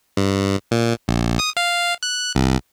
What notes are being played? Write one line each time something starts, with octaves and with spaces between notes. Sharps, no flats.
G2
A#2
A#1
D#6
F5
F#6
C2